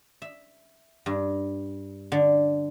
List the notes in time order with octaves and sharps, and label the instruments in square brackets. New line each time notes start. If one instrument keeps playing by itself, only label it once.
[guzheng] E5
G2
D3